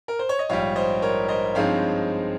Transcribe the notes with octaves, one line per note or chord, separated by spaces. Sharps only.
A#4
C5
C#5
D#5
A#1 G#2 G3 C#5 F5
C5 D#5
A#4 C#5
C5 D#5
G2 F3 G#3 C4 D#4 C#5 F5